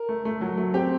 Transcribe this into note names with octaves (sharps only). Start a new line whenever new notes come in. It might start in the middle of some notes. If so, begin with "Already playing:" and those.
Already playing: A#4
A3
A3
F#3
A3
C4 G4